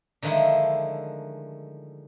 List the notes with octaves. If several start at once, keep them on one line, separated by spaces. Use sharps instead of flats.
D3 D#3 F3 G#3 A3 E4